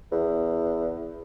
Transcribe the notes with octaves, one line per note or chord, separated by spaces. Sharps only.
E2